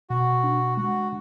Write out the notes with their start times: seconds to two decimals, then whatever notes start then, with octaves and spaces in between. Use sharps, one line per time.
0.10 B2 F#4
0.44 D4
0.77 G#3 F#4